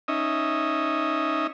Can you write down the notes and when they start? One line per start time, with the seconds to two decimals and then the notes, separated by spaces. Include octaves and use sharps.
0.08 C#4 D#4 D#5 E5